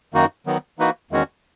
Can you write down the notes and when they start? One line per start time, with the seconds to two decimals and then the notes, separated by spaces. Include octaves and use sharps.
0.14 F#2 D#3 A#3 D#4 F#4
0.46 D#3 F#3 B3
0.79 E3 A#3 D#4 F#4 B4
1.11 E2 D#3 G#3 C#4 F#4